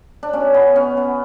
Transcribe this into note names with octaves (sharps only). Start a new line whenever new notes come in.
D4
B2 C#4
B3
B2 C#4
B3